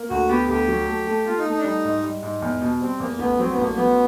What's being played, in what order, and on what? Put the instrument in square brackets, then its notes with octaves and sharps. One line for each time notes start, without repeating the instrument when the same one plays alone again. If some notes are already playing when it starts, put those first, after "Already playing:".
Already playing: [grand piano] A#3
[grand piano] D2 [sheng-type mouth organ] F#4
[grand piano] B3 [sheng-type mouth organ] G4
[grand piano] D2 [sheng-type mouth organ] G4
[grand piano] F#3
A3
A3
[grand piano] A3 [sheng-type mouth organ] F4
[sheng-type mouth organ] D#4
[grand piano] A3
[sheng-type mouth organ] D#4
D4
[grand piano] G3 [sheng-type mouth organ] D#4
[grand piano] G#2
G3
G#2
E2
B2
[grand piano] G3 [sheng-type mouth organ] C4
[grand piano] E2 [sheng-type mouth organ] A#3
[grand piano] A1 [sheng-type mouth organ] B3
[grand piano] F#3 [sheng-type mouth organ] C4
[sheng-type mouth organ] B3
[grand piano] A1
[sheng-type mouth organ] A#3
[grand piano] F#3 [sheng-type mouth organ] B3